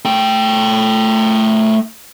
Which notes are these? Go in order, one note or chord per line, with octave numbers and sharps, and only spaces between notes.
A3 G5